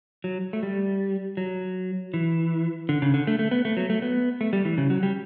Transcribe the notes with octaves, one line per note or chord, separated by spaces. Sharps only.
F#3
A3
G3
F#3
E3
D3
C#3
D3
A3
A3
B3
A3
F#3
A3
B3
A3
G3
E3
C#3
F#3
G3